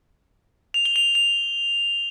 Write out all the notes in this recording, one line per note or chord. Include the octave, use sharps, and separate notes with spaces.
F7
G7
F7
F7